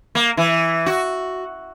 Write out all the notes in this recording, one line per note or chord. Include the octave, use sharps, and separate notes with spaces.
A#3
E3
F#4